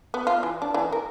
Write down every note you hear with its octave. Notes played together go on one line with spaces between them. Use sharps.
B3
F4
E3
D4
E3
A#4